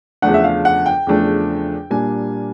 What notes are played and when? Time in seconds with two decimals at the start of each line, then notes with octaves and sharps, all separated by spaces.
0.22 E2 C#3 F3 A3 D4 F#5
0.34 E5
0.44 F5
0.65 F#5
0.86 G5
1.07 E2 C#3 F3 A3 D4
1.90 A#2 G3 A#3 D4 G#5